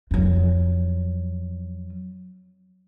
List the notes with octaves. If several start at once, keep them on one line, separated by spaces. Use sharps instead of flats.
F2 F#3